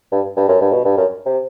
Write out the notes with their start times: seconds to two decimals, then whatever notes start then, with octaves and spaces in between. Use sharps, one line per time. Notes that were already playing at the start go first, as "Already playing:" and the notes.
0.12 G2
0.37 G2
0.48 F#2
0.61 G2
0.72 B2
0.85 G2
0.97 F#2
1.26 C3